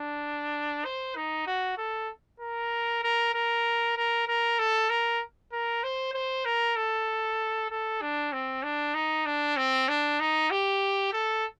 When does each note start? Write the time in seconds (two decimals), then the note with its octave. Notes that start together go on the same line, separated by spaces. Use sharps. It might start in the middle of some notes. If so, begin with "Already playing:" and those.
Already playing: D4
0.85 C5
1.16 D#4
1.47 F#4
1.77 A4
2.40 A#4
3.03 A#4
3.34 A#4
3.96 A#4
4.28 A#4
4.59 A4
4.89 A#4
5.52 A#4
5.83 C5
6.14 C5
6.45 A#4
6.76 A4
7.70 A4
8.01 D4
8.33 C4
8.63 D4
8.94 D#4
9.26 D4
9.57 C4
9.89 D4
10.20 D#4
10.51 G4
11.13 A4